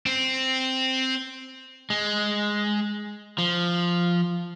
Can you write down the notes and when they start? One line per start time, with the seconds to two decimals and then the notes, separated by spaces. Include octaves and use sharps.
0.06 C4
1.90 G#3
3.38 F3